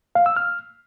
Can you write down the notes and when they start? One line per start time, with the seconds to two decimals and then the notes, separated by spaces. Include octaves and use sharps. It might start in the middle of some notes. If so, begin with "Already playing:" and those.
0.15 F5
0.26 E6
0.36 F6